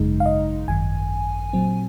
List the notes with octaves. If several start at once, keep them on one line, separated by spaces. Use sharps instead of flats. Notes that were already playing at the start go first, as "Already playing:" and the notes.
Already playing: G#1 F#2 C#3 G#3 D#4
F5
D#5
G#1 F#2 D#3 G#5
A#2 F#3 C4